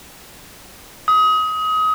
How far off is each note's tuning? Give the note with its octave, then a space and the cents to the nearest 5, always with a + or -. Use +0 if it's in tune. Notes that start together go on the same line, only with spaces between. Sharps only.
D#6 +25